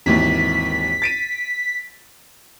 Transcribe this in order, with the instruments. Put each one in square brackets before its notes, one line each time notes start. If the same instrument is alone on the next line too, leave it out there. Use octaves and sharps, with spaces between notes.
[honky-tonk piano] G#1 D#2 E3 [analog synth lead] B6
[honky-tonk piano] A6 D7 D#7